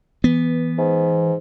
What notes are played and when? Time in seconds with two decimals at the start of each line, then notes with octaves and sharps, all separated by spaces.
0.24 E3 B3
0.78 G#2